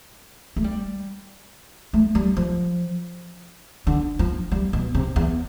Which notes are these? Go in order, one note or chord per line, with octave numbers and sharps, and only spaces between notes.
A3
G3
A3
G3
F3
D3
F3
G3
B2
C3
E2